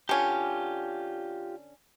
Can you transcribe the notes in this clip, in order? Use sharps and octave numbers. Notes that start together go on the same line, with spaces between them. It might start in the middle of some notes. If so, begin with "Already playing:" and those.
D3 C#4 F4 G4